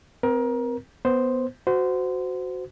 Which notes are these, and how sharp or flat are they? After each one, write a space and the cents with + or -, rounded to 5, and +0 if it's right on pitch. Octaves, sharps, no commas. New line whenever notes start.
C4 -25 A#4 +25
B3 +0 C5 +0
F#4 +0 C5 -25